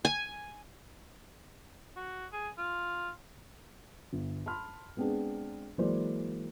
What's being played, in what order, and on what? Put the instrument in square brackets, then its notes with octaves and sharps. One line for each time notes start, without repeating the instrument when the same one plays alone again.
[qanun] G#5
[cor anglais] F#4
G#4
F4
[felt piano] G1
A5 B5 C6 F6
G#3 B3 C4 D4 G#4
E3 F#3 G#3 A#3 C5 D5